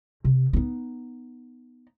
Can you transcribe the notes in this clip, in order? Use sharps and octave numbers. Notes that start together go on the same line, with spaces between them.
C3
B3 D#4